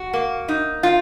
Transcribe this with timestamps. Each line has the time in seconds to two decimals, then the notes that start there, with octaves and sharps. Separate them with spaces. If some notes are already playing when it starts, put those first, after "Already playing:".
Already playing: F#4
0.13 A#3
0.48 D#4
0.83 F4